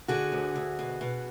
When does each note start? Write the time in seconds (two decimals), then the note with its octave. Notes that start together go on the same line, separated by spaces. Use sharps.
0.08 D3 F#4 G#4
0.32 D2
0.55 D2
0.79 B2
1.01 B2